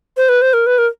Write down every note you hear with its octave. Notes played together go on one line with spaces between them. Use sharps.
C5
B4
C5
A#4
B4
A#4